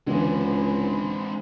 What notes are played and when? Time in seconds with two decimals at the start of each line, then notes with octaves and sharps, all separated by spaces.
0.07 C#2 D3 E3 G#3 C4